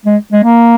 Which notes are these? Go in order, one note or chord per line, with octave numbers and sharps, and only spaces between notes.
G#3
G#3
A#3